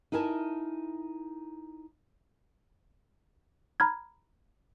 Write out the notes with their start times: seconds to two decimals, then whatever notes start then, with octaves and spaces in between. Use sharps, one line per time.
0.12 D#4 E4 A#4 G#5 A5
3.80 A#5 B5 F6 G#6